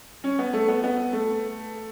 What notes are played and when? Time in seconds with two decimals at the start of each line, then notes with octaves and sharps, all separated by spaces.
0.24 C#4
0.39 B3
0.53 A3
0.68 B3
0.84 B3
1.13 A3